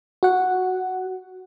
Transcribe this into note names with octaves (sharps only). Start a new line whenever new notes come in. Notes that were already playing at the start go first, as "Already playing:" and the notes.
F#4 F#5